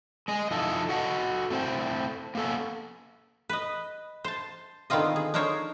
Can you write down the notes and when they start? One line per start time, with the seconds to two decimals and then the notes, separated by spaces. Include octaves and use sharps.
0.28 G#3 D#5
0.51 F3 D#4 E4 A4
0.89 F#4 A4 D#5 F#5
1.50 A3 C4 E4 C5
2.35 A#3 B3 C#4 A4
3.49 B4 D#5
4.24 C5 A5
4.90 D3 D#3 B3 C4 F4 D#5
5.16 G#4
5.34 D4 D#4 A#4 C5 C#5